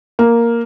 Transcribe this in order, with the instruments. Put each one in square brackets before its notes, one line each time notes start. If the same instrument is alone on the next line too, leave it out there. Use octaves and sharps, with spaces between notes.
[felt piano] A#3